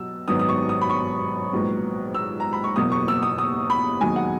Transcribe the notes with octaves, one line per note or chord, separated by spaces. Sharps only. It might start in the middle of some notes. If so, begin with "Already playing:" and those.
Already playing: B2 F#3 E6
G#1 F#2 D#3 F#3 B3 D#6
D#6
C#6
D#6
B5
C#6
A#1 G#2 F#3 B3
E6
A#5
B5
C#6
F#1 E2 B2 F#3 A#3 D#6
C#6
E6
D#6
D#6
B5
E1 D#2 D#3 F#3 G#5
F#5